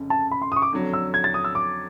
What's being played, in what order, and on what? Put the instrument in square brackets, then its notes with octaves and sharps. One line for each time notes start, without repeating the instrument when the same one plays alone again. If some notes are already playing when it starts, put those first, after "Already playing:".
Already playing: [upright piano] F1 F2 C#3
[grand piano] A5
B5
C6
D#6
C#6
D6
[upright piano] F2 D3 F#3
[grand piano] E6
G#6
A6
D#6
E6
D6